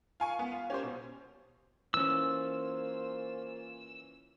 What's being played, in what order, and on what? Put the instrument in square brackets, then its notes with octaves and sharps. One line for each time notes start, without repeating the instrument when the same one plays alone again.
[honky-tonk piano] F4 G#5 C#6
B3
F4
C#4 G4 C5
B2
[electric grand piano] E3 C#4 [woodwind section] A#3 F4 [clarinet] C5 [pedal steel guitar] E6